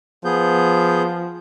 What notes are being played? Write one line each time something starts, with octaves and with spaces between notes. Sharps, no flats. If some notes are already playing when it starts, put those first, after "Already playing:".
F3 B3 G#4 G6